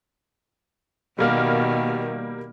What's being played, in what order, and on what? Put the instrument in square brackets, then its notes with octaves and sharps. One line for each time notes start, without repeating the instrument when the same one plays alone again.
[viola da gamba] B2 D#3 [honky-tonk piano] G3 A#3 F6